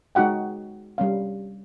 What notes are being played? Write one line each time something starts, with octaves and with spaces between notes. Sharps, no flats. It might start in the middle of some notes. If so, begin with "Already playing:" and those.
G#3 D#4 F#4 F#5 G5
G3 C#4 F5